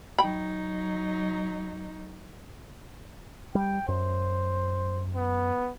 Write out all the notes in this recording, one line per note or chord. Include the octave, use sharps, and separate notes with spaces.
F#3 D#4 G5 B5
G3 G5
F#2 C5
B3